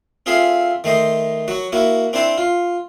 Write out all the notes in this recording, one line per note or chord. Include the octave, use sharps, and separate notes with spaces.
C4 F4 G#4 A4 E5 F5
D#3 A3 C5 D#5
F#3 F#4
A#3 E4 F#4
C4 D4 E4 C5 A5
F4